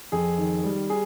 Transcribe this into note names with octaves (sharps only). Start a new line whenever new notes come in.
F2 G#4
D#3
G3
G#4